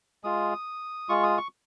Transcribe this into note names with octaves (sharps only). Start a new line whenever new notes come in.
G#3 F4 D#6
G#3 F4 C#6
D#6
C#6